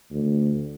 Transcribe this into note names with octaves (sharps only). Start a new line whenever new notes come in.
D2